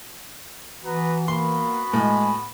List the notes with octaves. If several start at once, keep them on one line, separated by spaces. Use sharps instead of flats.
E3 B3 F#4 B4 A#5
A#3 B3 F#4 B5 C6
A2 G#3 G#5